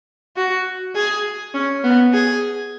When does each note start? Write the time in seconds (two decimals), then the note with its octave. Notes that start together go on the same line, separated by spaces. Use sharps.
0.36 F#4
0.95 G#4
1.54 C#4
1.84 B3
2.13 G#4